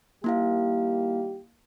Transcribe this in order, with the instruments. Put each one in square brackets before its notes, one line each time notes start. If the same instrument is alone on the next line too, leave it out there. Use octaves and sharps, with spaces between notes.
[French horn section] D#3 G3 G4 [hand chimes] A#3 E4 F5